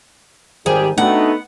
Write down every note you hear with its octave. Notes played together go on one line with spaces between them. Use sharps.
G#1 D#3 G3 G4 G#4 C5 G#5
A3 B3 D4 D#4 F#4 F#5